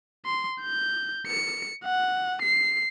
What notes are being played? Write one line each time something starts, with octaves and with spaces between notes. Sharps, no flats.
C6
G6
C#7
F#5
C7